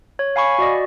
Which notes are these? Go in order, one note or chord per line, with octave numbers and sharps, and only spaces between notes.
C#5
F5 G#5 B5 C#6
F#4 D5 D#5